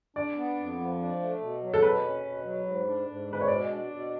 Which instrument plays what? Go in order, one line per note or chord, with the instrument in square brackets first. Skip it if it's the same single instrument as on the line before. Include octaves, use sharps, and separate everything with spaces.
[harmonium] D4 [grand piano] D5
[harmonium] B3
F2
F3
D4
A3
B2
F#3
[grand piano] A4
[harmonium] B2 [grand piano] B4
[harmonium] C#4
B2
F#3
G#2
D4
G#2
G#3
[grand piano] B4
C#5
[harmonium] B2 [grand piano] D5
[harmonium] D4
B2